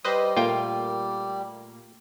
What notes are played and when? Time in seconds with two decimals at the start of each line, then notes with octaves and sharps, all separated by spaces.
0.05 G3 B4 C5 D#5
0.37 A#2 A3 A#3 F4 G5